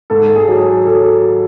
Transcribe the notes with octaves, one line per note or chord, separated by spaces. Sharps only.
G#2 A4
G#4
F#3
G#4
F#3 A4